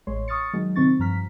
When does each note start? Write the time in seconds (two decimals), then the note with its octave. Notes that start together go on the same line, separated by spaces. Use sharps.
0.07 A1 G#3 C#5 C6
0.28 C#6 D#6 F6 A6 C#7
0.53 D#3 F#3 G#3
0.76 C3 D#3 C4 C#6 A6
0.99 G2 F3 A#5 F6 B6